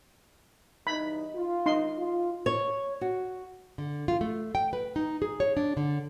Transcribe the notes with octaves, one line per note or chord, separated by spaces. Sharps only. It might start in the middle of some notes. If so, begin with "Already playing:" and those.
E2 G2 D#4 B5
F4
D#4 C6
F4
C#5
F#4
D3
F4
A3
G5
B4
D#4
G#4
C#5
D4
D3